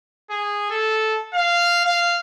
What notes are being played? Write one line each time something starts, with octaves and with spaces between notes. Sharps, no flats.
G#4
A4
F5
F5